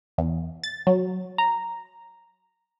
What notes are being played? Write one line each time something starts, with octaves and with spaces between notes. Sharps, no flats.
E2
A6
F#3
A#5